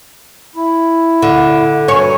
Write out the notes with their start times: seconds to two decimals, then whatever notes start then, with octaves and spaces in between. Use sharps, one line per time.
0.56 E4
1.22 D3
1.88 G2 F#3 C#5 G#5